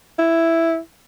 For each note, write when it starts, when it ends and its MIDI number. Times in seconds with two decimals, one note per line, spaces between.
0.19 0.78 64